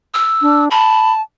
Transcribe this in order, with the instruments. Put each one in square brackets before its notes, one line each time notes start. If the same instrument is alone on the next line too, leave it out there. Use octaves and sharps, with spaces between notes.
[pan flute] E6
[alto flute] D4
[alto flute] A5 [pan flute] B5